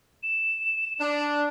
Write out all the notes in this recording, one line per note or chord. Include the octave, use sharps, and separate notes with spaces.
E7
D4